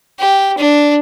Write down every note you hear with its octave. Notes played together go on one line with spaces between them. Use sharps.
G4
D4